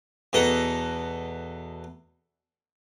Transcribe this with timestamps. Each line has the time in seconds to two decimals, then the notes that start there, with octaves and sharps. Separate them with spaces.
0.33 E2 B2 A4 A#5